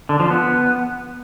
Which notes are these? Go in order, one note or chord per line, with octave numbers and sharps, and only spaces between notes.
D3
F3
B3